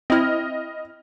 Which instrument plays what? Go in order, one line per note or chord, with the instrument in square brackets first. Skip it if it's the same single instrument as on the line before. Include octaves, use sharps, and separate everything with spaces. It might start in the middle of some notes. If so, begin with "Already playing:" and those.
[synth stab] C4 E4 [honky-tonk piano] D#5 F6